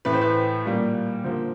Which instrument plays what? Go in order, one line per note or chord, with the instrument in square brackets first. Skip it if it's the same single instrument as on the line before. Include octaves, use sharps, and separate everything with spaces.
[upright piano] A2 E3 A3 B4
C5
B4
A#2 G3 A#3
D3 F3 A#3 C5